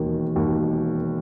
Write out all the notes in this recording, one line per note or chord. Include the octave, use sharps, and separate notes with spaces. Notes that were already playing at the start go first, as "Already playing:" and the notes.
Already playing: E1 D#2 D#3
E1 D#2 D#3